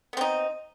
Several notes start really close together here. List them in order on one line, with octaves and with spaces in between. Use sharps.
B3 C4 D#4